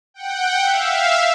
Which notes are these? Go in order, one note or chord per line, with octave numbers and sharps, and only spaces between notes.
F#5 G5
E5 F5